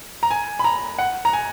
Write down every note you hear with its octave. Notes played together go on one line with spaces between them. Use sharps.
A#5
G#5
B5
A#5
F#5
A#5
G#5